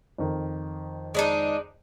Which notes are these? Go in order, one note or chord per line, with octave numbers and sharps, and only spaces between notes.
F2 D#3
G#3 D4 D#4